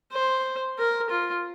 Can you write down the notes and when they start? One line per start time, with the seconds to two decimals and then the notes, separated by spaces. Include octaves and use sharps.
0.13 C5
0.78 A#4
1.10 F4